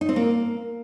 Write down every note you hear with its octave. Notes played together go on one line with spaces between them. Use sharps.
D#4
C4
A#3